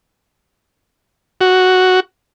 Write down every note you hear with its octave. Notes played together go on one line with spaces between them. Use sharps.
F#4